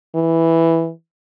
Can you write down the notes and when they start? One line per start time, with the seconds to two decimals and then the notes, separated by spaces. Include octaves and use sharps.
0.15 E3